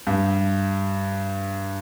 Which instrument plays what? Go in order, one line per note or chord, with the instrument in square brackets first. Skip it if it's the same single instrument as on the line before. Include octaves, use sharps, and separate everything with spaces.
[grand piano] G2